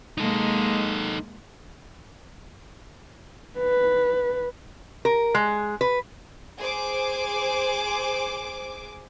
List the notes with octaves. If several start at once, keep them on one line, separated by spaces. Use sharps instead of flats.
G#3 A#3 D#4 A4
B4
A#4
G#3
B4
G#4 C5 D6